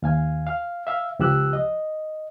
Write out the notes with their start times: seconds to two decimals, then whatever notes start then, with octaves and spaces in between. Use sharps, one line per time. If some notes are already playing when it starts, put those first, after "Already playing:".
0.02 D#2 F5 G#5
0.47 F5
0.87 E5 F5
1.19 C#2 F3 G4 E6 F#6
1.53 D#5